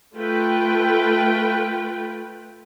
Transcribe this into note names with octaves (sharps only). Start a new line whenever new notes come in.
A3 F4 B4 G5